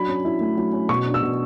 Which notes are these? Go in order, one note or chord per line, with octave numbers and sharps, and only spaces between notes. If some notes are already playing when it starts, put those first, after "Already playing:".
Already playing: F#3 D4 B5
C#4
E4
A3
F#3
C#4
B2 C#6
D4
E6
B2